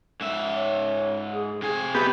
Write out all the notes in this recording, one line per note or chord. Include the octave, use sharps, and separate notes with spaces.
G#2 E5
C#5
G#4
C3 G#4 G#5
B3 G4 G#4